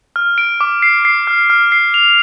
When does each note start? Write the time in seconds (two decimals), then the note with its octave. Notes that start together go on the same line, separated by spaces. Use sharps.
0.16 F6
0.38 D7
0.61 D6
0.82 C7
1.05 C7
1.27 F6
1.50 F6
1.72 C7
1.94 F7